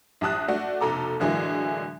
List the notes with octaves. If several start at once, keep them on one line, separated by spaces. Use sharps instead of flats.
A#1 G4 A5 D#6 F#6
A3 D4 F#4
F1 B2 A4 A#5 D6
A2 D3 E3 F#3 G#3 A#3